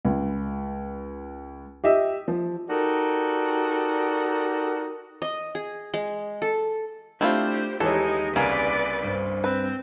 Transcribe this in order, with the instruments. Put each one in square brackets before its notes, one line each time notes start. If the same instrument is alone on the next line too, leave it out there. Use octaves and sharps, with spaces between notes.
[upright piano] C#2
G4 D#5 E5
F3
[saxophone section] D#4 F#4 G4 A4 A#4 D5
[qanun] D#5
G#4
G#3
A4
[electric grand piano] A3 D4 [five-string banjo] C4 E4 F4 [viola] G4 C5
[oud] D#2 G4 C#5 [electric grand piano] E3 [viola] G#3 D#4 [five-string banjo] A4
[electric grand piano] C2 C#3 [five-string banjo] A#3 G#4 [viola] B4 D5
[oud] G2 C5
[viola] C4 [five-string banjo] B4